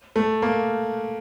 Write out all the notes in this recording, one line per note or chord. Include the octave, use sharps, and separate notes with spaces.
A3
A#3